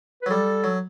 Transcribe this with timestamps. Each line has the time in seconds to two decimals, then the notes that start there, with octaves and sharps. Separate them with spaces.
0.22 B4
0.26 F#3
0.31 G3 A4
0.64 F#3